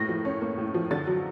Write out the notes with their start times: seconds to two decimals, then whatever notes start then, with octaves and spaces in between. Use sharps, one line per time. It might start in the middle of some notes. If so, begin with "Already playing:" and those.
Already playing: A2 A#3 A#6
0.09 F3
0.25 C#4
0.41 A#3
0.58 A2
0.74 F3
0.91 D3 A6
1.07 F#3